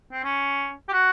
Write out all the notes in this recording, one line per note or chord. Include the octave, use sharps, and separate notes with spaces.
C4
C#4
G4
F#4